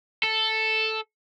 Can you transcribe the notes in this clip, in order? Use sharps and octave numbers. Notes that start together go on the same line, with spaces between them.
A4